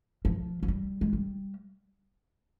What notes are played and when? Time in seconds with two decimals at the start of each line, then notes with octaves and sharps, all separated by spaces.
0.25 F3
0.63 F3
0.68 G3
1.01 G#3
1.13 G3